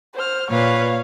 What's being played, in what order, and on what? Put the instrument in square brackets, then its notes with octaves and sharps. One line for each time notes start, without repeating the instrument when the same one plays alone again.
[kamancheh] C5 F6
[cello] A#2 B4 [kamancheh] C#5 F5